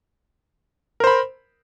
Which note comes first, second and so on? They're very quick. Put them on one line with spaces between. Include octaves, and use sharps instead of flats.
A#4 C5 B5